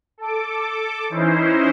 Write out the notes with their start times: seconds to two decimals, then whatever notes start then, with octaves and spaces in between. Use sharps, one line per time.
0.18 A4 D6
1.10 E3 C#4 D#4 E4 C5